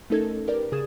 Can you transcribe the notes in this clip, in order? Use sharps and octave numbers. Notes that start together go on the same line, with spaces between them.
A3 C#4 D#4 A4 A#4 G#6
G4 A#4 B4 D5
C#3 G#4 D#6 G#6 A6 E7